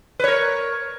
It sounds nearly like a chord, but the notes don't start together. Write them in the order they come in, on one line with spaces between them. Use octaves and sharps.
B4 C#5 A#4